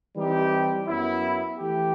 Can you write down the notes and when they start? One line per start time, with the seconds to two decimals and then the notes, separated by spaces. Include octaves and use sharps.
0.16 E3 G3 C4 D#4 G4
0.87 F#2 F#3 B3 E4
1.58 E3 A3 E4 G4